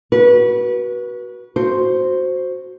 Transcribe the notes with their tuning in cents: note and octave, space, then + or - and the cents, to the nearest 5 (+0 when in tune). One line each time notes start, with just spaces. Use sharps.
F#4 +15 B4 -30
F#4 -5 C5 +0